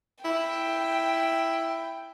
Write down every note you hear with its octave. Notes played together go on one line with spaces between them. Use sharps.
E4 G5